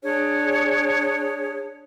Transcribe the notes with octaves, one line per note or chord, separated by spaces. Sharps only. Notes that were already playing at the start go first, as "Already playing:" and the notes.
D4 G#4 C#5